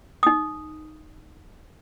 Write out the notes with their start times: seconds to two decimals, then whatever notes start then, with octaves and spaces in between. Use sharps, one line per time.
0.23 D#4 D#6